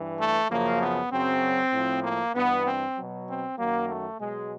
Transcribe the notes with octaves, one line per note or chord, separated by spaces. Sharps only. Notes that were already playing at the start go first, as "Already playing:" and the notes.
Already playing: G2 E3
A3
F#2 C#3 F3 A#3
B3
F#2 C#3 F#3 C4
A2 F3
A#3
G2 E3 B3
C4
B2 F#3
C4
F#2 D#3 F#3 A#3
A3
B2 F#3 G#3